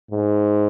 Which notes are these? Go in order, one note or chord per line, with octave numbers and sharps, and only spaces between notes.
G#2